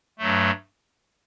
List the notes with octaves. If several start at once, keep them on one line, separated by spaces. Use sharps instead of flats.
G2 F#3 A3